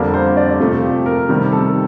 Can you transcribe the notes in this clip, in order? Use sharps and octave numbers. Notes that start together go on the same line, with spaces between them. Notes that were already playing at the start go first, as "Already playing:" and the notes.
Already playing: F2 D3 G3 A#3 D4 A#4
C5
D5
F2 C3 F3 A3
G4
A#4
C3 D#3 G3 C4 G4
A4